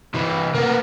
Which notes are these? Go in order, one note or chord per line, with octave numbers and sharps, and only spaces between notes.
C3 E3
A#3 B3